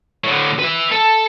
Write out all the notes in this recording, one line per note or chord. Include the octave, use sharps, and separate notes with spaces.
A2 D3
B4 E5
A4